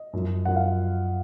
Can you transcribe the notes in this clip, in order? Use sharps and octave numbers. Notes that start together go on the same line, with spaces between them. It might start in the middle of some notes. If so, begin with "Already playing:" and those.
Already playing: D#5
F#2 F3
F#2 F3 F#5
F5